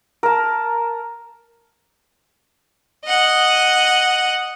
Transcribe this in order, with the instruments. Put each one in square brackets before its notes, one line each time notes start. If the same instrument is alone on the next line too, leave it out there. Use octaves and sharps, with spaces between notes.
[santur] A#4 A5
[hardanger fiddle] D#5 F#5